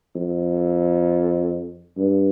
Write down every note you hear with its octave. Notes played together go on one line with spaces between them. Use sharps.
F2
G2